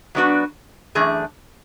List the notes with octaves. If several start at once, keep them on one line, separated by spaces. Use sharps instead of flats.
F#3 B3 D4 F#4 B4
F#2 E3 A3 D4 G#4